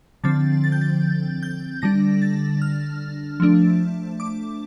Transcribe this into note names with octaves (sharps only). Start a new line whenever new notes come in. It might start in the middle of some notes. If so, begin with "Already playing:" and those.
D3 F3 C4 A6
A6
G6
A6
G6
D3 G3 D4 A#6
A6
F6
F3 A3 D4
D6